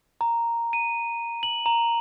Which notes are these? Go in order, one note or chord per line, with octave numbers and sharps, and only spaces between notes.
A#5
D#7
F#7
A#5